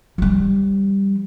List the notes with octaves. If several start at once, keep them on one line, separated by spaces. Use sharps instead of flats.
F3 G3